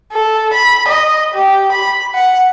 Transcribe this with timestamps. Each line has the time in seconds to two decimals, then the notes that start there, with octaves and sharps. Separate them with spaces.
0.12 A4
0.54 B5
0.88 D#5
1.34 G4
1.72 B5
2.15 F#5